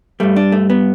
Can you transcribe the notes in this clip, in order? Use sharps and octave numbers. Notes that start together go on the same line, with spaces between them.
G2 G3 A3
D4
A3
B3